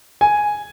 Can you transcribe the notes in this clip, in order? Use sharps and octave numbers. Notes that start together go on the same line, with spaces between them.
G#5